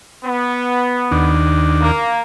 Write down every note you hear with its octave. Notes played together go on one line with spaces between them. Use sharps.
B3
D#2 D4
A#3